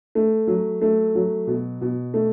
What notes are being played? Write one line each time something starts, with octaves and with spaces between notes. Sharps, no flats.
A3
F#3
A3
F#3
B2
B2
A3